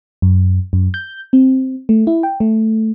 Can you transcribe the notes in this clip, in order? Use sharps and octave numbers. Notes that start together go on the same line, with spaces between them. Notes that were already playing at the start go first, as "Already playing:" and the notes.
F#2
F#2
G6
C4
A3
E4
G5
A3